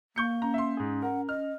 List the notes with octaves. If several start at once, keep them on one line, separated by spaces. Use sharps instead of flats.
A#3 C#6 G6 C#7
C#4 A#5
E5 C6
G#2 G#4
A#4 F#5
D#5 F6